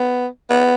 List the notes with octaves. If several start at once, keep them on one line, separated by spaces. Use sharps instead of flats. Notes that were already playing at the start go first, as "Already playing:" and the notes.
Already playing: B3
B3